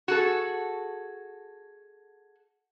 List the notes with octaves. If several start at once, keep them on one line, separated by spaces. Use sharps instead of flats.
F#4 G#4 A4